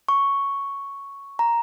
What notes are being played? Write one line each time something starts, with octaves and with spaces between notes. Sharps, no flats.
C#6
A#5